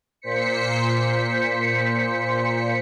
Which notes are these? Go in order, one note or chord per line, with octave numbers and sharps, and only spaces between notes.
A#2 C5 B6 C#7